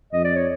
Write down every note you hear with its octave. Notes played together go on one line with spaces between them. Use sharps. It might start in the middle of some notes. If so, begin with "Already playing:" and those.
F2 D#5
D5
C#5